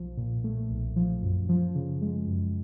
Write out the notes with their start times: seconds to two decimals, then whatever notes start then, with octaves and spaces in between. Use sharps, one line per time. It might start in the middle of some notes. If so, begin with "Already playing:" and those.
Already playing: B1 F3
0.17 A#2
0.44 A3
0.70 B1
0.96 F3
1.22 F#2
1.49 F3
1.75 C#3
2.02 G#3
2.27 F#2